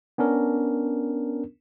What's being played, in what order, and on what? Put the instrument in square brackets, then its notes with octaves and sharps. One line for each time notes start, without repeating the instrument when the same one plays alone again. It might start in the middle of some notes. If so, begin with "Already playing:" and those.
[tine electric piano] B3 C#4 D4 A#4